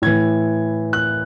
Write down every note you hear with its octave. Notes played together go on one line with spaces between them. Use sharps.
A2 E3 G#6
F#6